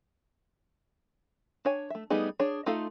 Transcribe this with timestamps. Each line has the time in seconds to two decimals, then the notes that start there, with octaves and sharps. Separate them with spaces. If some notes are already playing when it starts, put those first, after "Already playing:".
1.65 D4 C#5 G#5
1.90 A3 E5
2.10 G3 A3 B3 D#4 G#4
2.39 D4 G#4 C#5
2.66 A3 D#4 F4 A4 F5